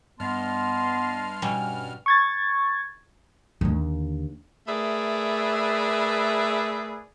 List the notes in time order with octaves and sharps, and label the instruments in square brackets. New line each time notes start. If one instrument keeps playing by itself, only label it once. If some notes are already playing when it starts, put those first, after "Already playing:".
[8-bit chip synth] G2 F6 [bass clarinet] B3 [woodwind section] D#5 A5 C6
[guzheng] B2 G3 C#4
[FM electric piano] C#6 G#6 A6
[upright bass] D#2 D3
[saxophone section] A3 G#4 A#4 B4 D5 E5